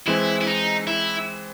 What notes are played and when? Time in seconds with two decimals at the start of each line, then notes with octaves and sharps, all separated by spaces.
0.07 E3 G#3 C4 E4
0.41 E4
0.47 D#4
0.87 E4